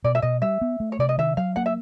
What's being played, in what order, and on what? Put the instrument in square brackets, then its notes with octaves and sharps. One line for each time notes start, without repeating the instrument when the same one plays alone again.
[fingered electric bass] B2 [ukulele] D5
[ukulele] E5
[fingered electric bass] B2 [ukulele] D#5
[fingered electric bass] G3 [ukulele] E5
[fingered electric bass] B3
A3
[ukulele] C#5
[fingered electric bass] C3 [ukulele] D5
[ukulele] D#5
[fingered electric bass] D#3 [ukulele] E5
[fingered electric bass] F#3 [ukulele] F5
[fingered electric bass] A#3 [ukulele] F#5
[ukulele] E5